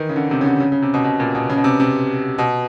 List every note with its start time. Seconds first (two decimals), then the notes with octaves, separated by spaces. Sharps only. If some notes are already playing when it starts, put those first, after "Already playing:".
Already playing: D#3 E3
0.09 C#3
0.16 D3
0.31 C3
0.41 C#3
0.46 D3
0.60 C#3
0.72 C#3
0.82 C3
0.94 B2
1.04 B2
1.20 A#2
1.35 B2
1.50 C#3
1.57 B2
1.64 C3
1.80 C3
2.38 B2